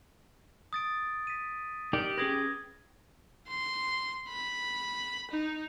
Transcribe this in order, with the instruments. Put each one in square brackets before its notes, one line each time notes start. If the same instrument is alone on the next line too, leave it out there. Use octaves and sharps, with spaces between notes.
[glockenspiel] D#6 A6 D7
B6 D#7
[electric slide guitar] D#4 A#4 D5 [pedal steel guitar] G4
[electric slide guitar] C#4 G#4 B4 [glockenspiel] D#6 G#6 A#6
[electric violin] C6
B5
D#4